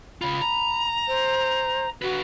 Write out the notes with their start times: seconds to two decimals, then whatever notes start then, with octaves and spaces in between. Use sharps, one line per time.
0.22 C#3 F4 B5
0.42 A#5
1.08 C5
2.02 D3 F#4 B4